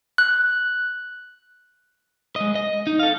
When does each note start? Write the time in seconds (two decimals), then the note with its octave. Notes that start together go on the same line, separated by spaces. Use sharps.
0.18 F#6
2.36 G#3 D#5
2.55 D#5
2.87 D#4
2.99 A4 F5